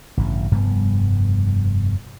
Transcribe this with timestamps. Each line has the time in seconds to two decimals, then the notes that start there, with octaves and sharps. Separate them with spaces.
0.17 A1 G2 C#3
0.51 F1 G2 G3 B3